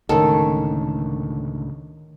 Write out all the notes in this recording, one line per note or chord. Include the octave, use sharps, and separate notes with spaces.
C#2 A2 D3 D#3 C#4 A4